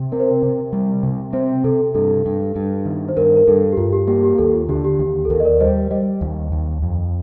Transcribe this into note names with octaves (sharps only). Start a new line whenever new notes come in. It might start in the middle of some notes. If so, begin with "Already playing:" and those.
Already playing: C3
C4 A#4
C5
A#4
C3
G3
C3
C4 C5
C3 A4
G2 A4
G2
G2
D#3
C5
G2 A#4
A#4
G2 A4
G4
G2 F4
G4
A#3 G4
G4
D#2 A4
F4
D3 G4
G4
D#2 G4
A4
D#2 A#4
D#5
A#4 D5
G3 C5 D#5
G3 C5 D#5
D#2
D#2
F2